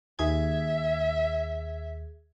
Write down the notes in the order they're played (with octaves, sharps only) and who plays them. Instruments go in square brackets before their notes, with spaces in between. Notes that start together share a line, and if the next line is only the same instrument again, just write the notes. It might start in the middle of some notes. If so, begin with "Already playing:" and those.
[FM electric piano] D#2 G#4 G#6 [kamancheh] E5